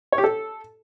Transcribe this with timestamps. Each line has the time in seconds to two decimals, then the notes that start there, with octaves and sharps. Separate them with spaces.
0.13 C#5
0.18 G4
0.24 A4